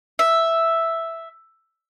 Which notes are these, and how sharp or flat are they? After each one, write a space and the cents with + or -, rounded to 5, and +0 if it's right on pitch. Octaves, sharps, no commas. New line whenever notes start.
E5 +0